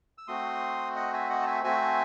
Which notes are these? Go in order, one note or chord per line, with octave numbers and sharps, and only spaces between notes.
E6
A3 C4 F#4 C6 D#6
D#5 F#5
E5 G#5
D#5 F#5
A5
E5 G#5
A3 C4 F#4 E5 G#5